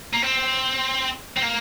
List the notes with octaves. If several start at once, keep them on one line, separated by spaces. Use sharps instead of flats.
A#3
C4
C4
A#3